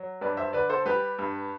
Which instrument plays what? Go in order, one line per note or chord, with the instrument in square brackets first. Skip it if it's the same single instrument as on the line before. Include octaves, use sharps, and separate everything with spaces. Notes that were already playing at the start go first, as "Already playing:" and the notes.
Already playing: [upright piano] F#3
G2 B4 D5
C5 E5
D3 B4 D5
A4 C5
G3 G4 B4
G2